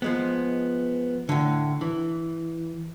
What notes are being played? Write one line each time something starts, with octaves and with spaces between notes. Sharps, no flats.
F3 G#3 B3
A2 D3
E3